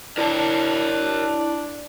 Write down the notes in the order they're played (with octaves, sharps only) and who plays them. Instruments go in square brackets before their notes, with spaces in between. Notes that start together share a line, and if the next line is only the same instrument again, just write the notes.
[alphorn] D4 [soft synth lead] E4 [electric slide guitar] A#4 C#5 A5